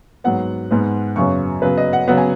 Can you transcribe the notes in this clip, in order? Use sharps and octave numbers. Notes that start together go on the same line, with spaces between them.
G#2 F#3 B3 F#5
G#2 G#3 B3
F#2 C#3 F#3 B3 C#6
C#3 F#3 B3 B4
D#5
F#5
C#3 F#3 B3 F#5
G#5